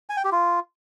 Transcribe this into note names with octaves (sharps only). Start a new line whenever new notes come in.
G#5
G5
G4
F4